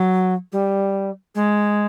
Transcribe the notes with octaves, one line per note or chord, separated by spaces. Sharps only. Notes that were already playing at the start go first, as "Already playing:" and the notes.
Already playing: F#3
G3
G#3